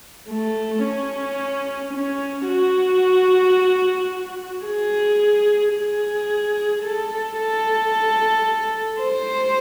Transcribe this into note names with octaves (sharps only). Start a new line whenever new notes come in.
A3
C#4
C#4
F#4
G#4
G#4
A4
A4
C5